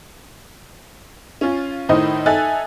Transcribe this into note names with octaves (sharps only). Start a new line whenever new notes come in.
C#4 F4
A2 D#3 C5 D#5 D#6
D#4 A4 E5 G#5 F#6 A6